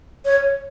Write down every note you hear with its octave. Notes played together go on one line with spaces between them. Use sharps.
C#5